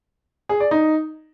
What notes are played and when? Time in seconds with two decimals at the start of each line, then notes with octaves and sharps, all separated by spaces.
0.49 G#4
0.60 D5
0.71 D#4